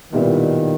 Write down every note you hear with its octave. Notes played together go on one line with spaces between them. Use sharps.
B1 A#2 D#3 G3 B3 E4